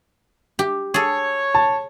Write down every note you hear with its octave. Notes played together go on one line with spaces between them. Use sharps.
G4
G#4 A4 C#5
A5